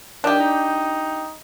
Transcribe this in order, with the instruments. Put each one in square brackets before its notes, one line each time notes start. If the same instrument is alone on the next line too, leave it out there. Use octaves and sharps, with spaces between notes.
[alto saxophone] D#3 [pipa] D4 G4
[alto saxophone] D#4